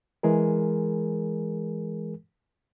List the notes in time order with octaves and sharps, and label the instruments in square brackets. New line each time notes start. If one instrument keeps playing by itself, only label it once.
[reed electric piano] E3 G#3 G#4 A#4